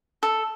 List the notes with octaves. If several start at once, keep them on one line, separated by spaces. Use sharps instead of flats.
A4